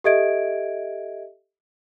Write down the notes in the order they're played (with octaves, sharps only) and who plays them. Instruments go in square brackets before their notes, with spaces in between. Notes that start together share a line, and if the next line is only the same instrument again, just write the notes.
[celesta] G4 A4 D#5 E5 G#6 D7